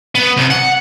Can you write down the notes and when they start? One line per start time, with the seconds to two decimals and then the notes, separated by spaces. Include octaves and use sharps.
0.15 B3
0.37 C2
0.50 F#5